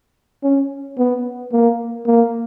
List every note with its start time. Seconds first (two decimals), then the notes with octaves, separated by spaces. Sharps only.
0.43 C#4
0.98 B3
1.52 A#3
2.07 A#3